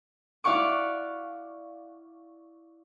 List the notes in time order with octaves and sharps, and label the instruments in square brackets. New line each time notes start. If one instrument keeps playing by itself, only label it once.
[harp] E4 D5 F5 F#5 C#6 D6